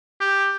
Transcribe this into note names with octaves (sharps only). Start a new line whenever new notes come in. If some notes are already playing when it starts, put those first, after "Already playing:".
G4